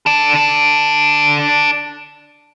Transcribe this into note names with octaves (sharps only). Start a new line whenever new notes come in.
D4 A4